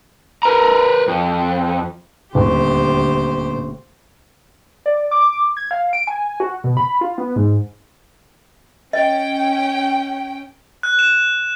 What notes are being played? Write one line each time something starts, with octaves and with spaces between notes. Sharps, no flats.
A#4 B4 A#5
F2
D#1 D2 G4 C5
D5
D6
G#6
F5
D7
G#5
F#4
B2
B5
F4
B3
G#2
C#4 D#5 G5
F#6
E7